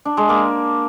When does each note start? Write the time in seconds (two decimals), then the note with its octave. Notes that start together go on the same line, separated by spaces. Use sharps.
0.05 D4
0.17 G#3
0.29 A#3